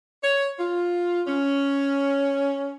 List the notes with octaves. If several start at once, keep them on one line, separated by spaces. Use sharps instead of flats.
C#5
F4
C#4